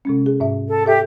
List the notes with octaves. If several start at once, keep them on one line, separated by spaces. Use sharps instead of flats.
C3 G#3 C#4
G#4
G#2 E5
A4
G4 A4 E5